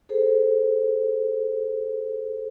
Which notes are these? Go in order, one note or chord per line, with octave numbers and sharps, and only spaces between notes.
G#4 A4 C5